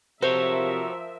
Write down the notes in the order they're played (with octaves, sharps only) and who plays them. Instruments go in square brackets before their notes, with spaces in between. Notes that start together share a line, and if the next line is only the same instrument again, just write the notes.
[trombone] C3 [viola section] F3 A#4 E5 [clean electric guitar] F#4 A4 C#5 [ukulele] C5